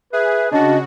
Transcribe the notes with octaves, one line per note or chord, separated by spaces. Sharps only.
G#4 B4 E5
C#3 D4 F#4 D#5